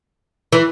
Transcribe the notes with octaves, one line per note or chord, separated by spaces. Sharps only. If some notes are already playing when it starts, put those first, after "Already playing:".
E3